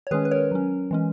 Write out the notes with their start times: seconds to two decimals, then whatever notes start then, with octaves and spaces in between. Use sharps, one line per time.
0.07 C#5
0.11 D#3 G#3 C#4 G#4 B4
0.25 B4
0.31 A#4 C#5
0.51 F#3 C#4
0.91 E3 G#3 C#4